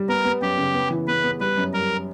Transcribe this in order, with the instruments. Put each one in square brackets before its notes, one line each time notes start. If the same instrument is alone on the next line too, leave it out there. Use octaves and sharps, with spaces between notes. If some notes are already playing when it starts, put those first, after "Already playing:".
Already playing: [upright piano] G3
[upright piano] B3 [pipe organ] A#4
[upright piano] B3
[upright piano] F#2 [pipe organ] G4
[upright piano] C#3
B3
E3
[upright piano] B3 [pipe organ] B4
[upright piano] B3
[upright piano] G3 [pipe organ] B4
[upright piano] F#2
[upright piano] G3 [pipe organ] A#4